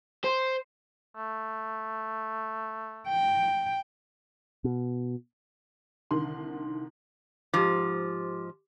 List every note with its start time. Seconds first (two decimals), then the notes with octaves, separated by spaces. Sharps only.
0.24 C5
1.17 A3
3.08 G5
4.64 B2
6.11 C2 D3 D#3 C6
7.54 G#2 F3 G4 D6